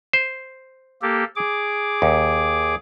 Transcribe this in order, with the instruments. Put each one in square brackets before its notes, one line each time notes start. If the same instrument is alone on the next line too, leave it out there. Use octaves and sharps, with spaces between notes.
[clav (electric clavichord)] C5
[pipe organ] A#3 G4 A4
G#4 D6
[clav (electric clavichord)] D#2